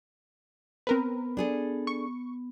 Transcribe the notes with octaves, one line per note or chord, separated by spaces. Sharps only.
B3 C4 A#4 B4
D4 G#4 A4
C#6